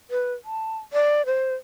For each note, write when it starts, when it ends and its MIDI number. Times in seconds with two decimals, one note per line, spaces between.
0.10 0.33 71
0.45 0.78 81
0.93 1.25 74
1.26 1.54 72